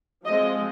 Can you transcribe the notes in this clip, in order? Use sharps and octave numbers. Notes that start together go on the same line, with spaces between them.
F3 G#3 C4 D#5